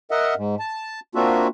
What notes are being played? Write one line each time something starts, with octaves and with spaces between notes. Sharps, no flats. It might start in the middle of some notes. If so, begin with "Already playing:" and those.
A#4 D#5 E5 F#5
G#2
A5
A#3 C4 D4 F4 F#4 E5